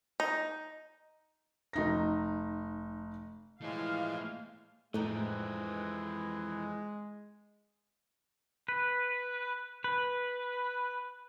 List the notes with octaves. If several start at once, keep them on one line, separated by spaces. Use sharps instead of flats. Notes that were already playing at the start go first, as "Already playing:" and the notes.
D#4
F1 D#4 A#6
E3 F3 G#3 A3 E4 C#5 F5
F2 A2 E3 G#3 C4 D#4
B4
B4